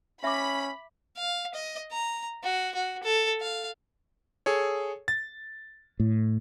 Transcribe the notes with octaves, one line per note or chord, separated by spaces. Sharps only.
C#4 E5 B5 D6
F5
D#5
A#5
F#4
F#4
A4
F5
G#4 A4 C#5
A6
A2